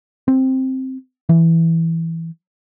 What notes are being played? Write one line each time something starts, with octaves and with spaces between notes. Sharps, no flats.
C4
E3